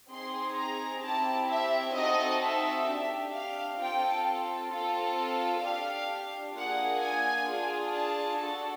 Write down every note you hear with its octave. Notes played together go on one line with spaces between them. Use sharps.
C4 D#4 G#4 C6
A#5
C4 E4 G4 A5
E5
C4 D#4 F#4 A4 D#5
E5
D4 G4
F5
C4 F4 A4 G5
C4 F4 A4
D4 G4 F5
A#3 D4 F4 G#4 F#5
G#5
D4 F4 G#4
A5
D4 F#4 A4